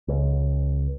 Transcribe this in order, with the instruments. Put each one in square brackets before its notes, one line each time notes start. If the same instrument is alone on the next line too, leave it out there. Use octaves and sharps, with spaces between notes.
[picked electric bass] C#2